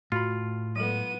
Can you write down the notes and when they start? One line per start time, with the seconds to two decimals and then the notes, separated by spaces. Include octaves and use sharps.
0.12 A2 F4 F#4 B5
0.76 F#3 G#3 B3 A4 D#7